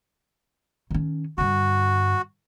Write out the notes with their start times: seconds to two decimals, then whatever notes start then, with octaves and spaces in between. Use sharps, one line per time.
0.91 D#3 C#4
1.38 G2 D3 F#4